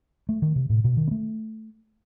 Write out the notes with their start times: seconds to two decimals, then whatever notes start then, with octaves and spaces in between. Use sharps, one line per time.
0.29 A3
0.42 D#3
0.56 C3
0.70 A2
0.84 B2
0.97 D#3
1.07 B3
1.11 A3